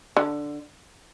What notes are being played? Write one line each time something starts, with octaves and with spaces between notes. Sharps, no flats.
D3